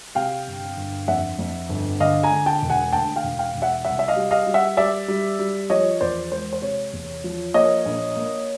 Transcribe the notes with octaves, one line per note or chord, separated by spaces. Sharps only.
C3 F5 G5
G1
G1
F2 E5 F#5
F2
G1
D3 D#5 F5
G#5 A#5
D3
G5 A5
E1
F#5 G#5
D2 G5 A5
F5 G5
E1
F5 G5
E1
E5 F#5
C2 E5 F#5
E5
D#5 F5
G3
D#5 F5
G3
E5 F#5
G3 D5 E5
G3
G3
F3 C#5 D#5
E2 C5 D5
G#3 C5
C5
C3 C#5
E2
F3
A#3 C#5 D#5
A#1
A#3